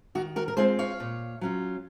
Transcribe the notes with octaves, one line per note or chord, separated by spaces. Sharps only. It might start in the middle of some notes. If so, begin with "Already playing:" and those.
D#3 F#4
F#4 A#4
A#4
G#3 C4 F4 G#4 C5
C#5 F5
A#2
F#3 C#4 F4